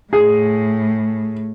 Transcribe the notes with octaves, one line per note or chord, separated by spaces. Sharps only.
A2 G#4